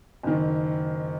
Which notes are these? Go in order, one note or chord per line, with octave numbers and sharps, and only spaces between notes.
F#1 D#3